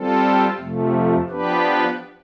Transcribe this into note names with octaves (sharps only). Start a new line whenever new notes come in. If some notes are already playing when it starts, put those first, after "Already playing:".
Already playing: G3 C4 F4 A4
F2 C3 F3 A3
F3 B3 D4 G4 B4